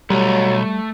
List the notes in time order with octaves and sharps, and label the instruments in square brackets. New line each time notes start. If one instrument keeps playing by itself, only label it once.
[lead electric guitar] B1 [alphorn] F#3 [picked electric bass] G3 [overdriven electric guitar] A3